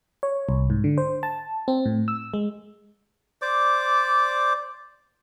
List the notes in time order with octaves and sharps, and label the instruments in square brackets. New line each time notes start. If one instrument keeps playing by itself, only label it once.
[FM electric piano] C#5
C2
G#2
D3
C5
A5
C4
A2
E6
G#3
[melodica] C5 D5 D6